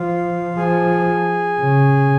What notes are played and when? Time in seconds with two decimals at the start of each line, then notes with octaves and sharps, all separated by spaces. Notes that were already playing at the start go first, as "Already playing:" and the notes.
Already playing: F3 F4
0.56 F3 G#4
1.60 C#3